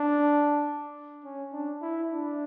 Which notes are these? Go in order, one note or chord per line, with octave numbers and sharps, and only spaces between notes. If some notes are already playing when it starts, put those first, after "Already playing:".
Already playing: D4
C#4
D4
E4
D4